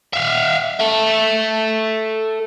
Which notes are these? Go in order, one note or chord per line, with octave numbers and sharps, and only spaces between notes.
E5 F5
A4 E5